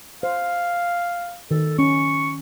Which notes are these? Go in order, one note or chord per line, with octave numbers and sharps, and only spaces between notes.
C5 F5
D#3 A4
C#4 C#6